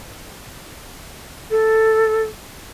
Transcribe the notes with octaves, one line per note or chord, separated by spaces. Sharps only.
A4